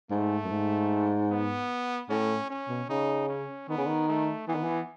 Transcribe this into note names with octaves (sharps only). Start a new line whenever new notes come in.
G#2 A3
F#2
G#2
B3
A2 C#4
C#4
B2
C#3 D#4
C#4
D#3 B3
C#3
D#3
A3
E3 B3
D#3
E3